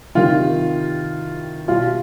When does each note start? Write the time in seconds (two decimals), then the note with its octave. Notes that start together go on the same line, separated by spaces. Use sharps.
0.15 C3 D#3 G3 F4
1.68 B2 G3 F4